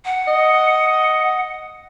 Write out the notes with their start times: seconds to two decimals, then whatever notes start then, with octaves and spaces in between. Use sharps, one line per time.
0.05 F#5
0.27 D#5